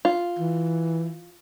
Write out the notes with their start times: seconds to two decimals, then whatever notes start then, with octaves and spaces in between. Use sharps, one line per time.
0.05 F4
0.39 E3